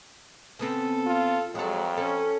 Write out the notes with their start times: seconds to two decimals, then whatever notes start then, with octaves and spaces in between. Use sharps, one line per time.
0.59 C#3 B3 C4 A4
1.07 F4
1.55 F2 F#3 G#3 A4
1.97 C#4 A4